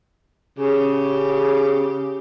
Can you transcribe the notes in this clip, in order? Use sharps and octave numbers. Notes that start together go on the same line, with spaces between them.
C#3 G4